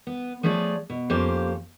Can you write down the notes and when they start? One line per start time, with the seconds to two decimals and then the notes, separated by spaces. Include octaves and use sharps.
0.07 B3
0.43 F3 A3 G#4 C#5 D5
0.90 B2
1.10 F2 A#3 C#4 G4 C5 F5